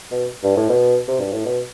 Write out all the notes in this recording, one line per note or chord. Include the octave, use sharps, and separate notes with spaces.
B2
G2
A2
B2
C3
G2
A2
B2